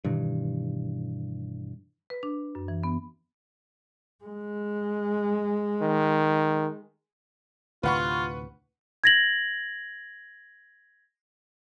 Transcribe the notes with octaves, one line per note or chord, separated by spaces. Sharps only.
G2 B2 D#3 E3
B4
D4
F#2
E3
B3
G#3
D#3
D2 A2 C3 F4 B4 F#5 C#6
G#6 A#6 F#7